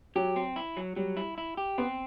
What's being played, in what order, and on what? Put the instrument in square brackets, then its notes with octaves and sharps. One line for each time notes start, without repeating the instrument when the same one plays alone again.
[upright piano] F#3 [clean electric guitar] G4
[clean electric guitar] C4
E4
F#3
[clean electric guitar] F#3 [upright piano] G3
[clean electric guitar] E4
E4
G4
[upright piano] B3 [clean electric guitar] C4